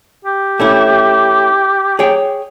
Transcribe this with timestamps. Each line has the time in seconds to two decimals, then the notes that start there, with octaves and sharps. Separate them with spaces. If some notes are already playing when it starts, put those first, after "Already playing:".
0.24 G4
0.60 A3 C#4 E4
1.99 G#4 C#5 G5